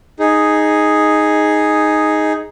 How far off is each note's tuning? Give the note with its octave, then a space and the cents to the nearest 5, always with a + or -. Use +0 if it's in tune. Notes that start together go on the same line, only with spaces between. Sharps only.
D#4 +0 G#4 +0